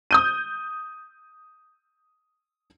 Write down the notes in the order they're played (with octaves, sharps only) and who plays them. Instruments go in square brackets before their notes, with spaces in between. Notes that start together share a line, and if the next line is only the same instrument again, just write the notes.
[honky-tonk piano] D#6 G6 D#7